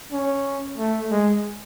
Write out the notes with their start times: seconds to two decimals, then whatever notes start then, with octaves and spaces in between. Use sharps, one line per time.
0.12 C#4
0.78 A3
1.11 G#3